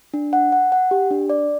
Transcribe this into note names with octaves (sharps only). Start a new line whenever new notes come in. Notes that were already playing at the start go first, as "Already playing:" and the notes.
D4
F#5
F#5
F#5
G4
D4
D5